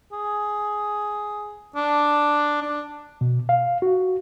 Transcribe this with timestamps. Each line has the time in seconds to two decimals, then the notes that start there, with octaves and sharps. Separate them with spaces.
0.13 G#4
1.76 D4
2.62 D4
3.21 B2
3.49 F5
3.82 F#4